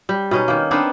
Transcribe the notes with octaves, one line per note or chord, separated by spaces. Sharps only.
G3
B2 C#4 D#4
D#3 A#3
B3 C4 D4 D#4